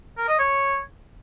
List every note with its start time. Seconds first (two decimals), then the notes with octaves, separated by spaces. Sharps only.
0.17 A#4
0.28 D#5
0.39 C#5